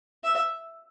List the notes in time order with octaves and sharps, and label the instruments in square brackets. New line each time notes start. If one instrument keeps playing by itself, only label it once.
[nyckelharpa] E5